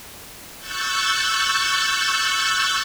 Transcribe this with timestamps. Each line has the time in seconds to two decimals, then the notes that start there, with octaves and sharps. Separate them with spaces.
0.59 C#6 E6 F#6 G6 A6